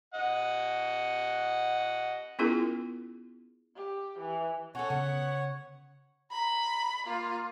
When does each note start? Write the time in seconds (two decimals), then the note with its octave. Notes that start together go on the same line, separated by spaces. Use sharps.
0.14 D#5 F#5
2.39 B3 C#4 E4 F4 G#4 A#4
3.75 G4
4.19 E3
4.75 C#4 A4 C#5 F#5
4.90 C#3 B3
6.32 A#5 B5
7.06 A#3 F4